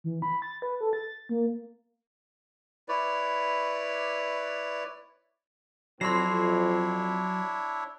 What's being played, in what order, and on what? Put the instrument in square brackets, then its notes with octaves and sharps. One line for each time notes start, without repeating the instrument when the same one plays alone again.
[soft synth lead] E3
B5
A6
B4
A4
A6
A#3
[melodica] E4 B4 C#5 D5
[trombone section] F2 C4 [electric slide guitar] F#3 [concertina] D4 E4 C#5 [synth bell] C6 C7